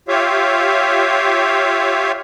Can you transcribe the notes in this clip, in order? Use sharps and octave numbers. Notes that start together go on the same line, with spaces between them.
F4 G4 C#5 E5 F5